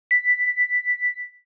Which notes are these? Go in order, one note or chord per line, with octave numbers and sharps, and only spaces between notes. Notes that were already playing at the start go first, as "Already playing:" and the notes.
B6